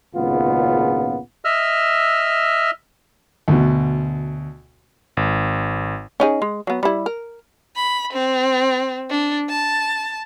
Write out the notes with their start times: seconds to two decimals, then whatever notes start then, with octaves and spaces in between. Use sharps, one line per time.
0.15 G#1 C#2 A#2 C#3 B3 F4
1.45 D#5 E5 E6 F6
3.48 D2 B2
5.17 G#1
6.20 C#4 D#4 G#4
6.42 G#3
6.67 F#3 B3
6.83 G3 E4
7.06 A#4
7.76 B5
8.13 C4
9.10 D4
9.49 A5